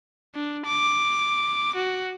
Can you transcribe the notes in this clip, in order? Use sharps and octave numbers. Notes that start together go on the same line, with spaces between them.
D4
D6
F#4